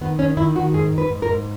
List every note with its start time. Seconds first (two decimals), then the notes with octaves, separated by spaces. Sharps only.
0.01 D#3 B3
0.19 D#3 C#4
0.37 D#3 E4
0.55 D#3 F#4
0.74 G#2 G#4
0.92 G#2
0.98 B4
1.10 G#2
1.22 A#4
1.29 G#2